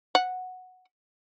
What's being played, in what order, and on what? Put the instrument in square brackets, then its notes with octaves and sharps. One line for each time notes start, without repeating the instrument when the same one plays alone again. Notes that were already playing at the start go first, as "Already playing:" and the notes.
[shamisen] F#5